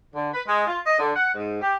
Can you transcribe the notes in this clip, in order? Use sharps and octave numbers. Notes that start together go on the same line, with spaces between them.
D3
B4
G#3
F4
D#5
D3
F#5
G#2
G4